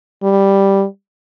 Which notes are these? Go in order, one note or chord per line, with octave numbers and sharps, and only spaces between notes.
G3